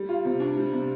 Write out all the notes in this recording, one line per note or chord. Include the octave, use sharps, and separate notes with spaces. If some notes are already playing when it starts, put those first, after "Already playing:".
Already playing: G3
F4
C3
D4
G3
C3